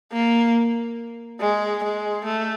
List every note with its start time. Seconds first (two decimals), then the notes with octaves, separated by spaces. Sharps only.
0.12 A#3
1.40 G#3
1.83 G#3
2.25 A3